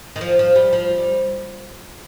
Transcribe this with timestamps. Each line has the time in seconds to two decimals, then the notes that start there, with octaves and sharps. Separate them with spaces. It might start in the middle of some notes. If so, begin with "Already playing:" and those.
0.16 D#3
0.21 F3
0.39 F3
0.56 G3
0.73 F3
0.98 G3